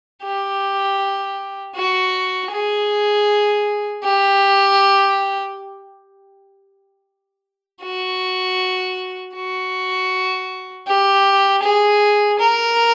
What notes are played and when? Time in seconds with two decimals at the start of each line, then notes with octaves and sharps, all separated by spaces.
0.23 G4
1.75 F#4
2.51 G#4
4.04 G4
7.83 F#4
9.35 F#4
10.87 G4
11.63 G#4
12.39 A#4